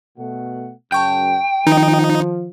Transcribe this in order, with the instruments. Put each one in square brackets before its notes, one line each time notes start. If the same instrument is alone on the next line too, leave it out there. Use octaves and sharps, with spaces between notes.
[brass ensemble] B2 A3 F#5
[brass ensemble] F#2 C#3 [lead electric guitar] G5 [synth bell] A5 C#6 G6
[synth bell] D#3 [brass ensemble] F3 [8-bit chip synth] D#4